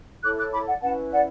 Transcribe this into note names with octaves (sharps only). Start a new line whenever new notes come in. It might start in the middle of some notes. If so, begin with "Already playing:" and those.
E4 A4 C#5 D6 F#6
D6 F#6
B5 D6
D5 F#5
C#4 E4 B4 F#5 A5
D5 F#5